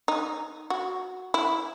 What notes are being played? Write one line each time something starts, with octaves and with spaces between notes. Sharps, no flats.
D#4
F#4
E4